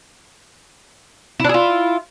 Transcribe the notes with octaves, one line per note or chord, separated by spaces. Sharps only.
D4 E4 F4 G#4